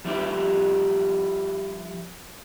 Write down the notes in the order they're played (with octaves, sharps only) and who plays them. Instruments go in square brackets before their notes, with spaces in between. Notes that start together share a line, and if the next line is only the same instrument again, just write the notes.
[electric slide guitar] F3 G3 E4 G4